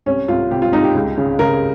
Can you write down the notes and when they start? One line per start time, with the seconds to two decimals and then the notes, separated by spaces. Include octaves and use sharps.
0.06 C2 C#4
0.28 C2 F4
0.51 C3 G4
0.62 F4
0.72 C2 D#4
0.84 G4
0.95 C#2
1.17 C#3
1.39 C#3 A#4